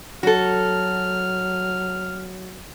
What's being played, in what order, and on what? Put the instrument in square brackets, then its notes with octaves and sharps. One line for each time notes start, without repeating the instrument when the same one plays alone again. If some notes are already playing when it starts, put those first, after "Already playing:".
[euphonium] F#3 [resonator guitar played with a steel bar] F#4 A4 [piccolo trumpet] F6